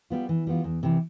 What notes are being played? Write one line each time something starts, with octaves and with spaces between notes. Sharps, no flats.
G3 B3 F4
E3
G3 B3 F4
E2
C3 E3